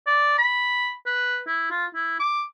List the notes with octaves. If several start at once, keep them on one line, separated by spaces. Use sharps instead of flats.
D5
B5
B4
E4
F4
E4
D6